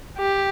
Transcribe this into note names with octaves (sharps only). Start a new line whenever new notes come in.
G4